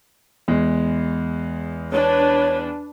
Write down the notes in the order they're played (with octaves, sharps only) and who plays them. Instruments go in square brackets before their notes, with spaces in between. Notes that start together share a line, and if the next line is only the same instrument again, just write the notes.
[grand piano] E2 G#3
[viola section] D4 B4 [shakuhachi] C#5